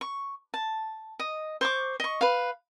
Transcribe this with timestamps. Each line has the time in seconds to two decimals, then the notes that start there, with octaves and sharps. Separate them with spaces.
0.01 C#6
0.54 A5
1.19 D#5
1.61 C5 C#6 D6
2.00 D#5 C#6
2.21 B4 F5